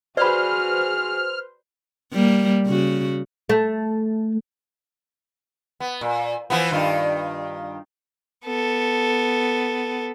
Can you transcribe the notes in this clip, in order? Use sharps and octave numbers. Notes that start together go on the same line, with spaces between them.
F#4 G#4 B4 C5 D5 B5 F6
G3 A#3
C#3 F#4
A3
B3
A#2
E3 F3 B3
G2 D#3 F4
B3 A4